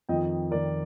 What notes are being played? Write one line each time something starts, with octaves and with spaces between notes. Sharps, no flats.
F2 D#3 D#5 G5
F2 D#3 A#4 D5